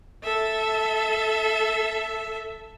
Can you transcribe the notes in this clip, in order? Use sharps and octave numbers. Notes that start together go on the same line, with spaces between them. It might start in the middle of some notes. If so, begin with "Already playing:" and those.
A4 E5